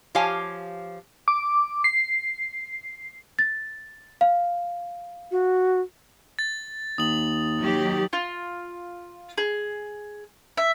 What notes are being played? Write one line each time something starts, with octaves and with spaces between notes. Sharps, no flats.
F3 G4 C#5 F5 G#5
D6
C7
A6
F5
F#4
A6
D#2 D#6 F#7
D#3 F#3 G4
F4
G#4
E5